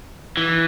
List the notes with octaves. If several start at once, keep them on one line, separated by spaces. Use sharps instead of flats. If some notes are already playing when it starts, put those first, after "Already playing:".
E3